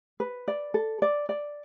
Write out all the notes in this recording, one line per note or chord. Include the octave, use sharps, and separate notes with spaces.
B4
D5
A4
D5
D5